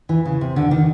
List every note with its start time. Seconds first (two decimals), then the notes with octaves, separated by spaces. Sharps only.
0.09 E3
0.25 C#3
0.41 C3
0.56 D3
0.71 D#3